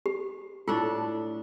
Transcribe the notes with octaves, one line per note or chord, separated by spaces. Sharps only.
G4
A2 D4 F4 A4